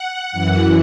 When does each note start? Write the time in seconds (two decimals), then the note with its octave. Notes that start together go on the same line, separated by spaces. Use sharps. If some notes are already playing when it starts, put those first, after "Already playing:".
Already playing: F#5
0.32 F#2 E3